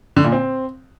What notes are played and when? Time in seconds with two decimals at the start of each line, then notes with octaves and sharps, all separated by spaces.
0.16 D3
0.24 A#2
0.32 C4